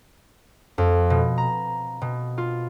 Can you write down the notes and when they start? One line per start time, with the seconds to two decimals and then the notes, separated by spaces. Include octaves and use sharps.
0.78 F2
1.10 B2
1.38 A#5
2.02 B2
2.38 F4